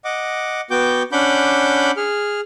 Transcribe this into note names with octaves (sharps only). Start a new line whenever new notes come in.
D#5 F#5 D6
B3 F#4 G5 D6 G6
C#4 D4 F#5 B5 D6 G6
G#4 F6